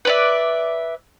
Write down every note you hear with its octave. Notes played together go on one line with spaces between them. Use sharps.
B4 D5 E5